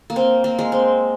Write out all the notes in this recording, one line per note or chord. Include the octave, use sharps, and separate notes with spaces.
A#3
C4
A#3
G#3
C4